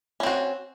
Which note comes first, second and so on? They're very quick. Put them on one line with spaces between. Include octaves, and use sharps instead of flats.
C#4 C4 F#4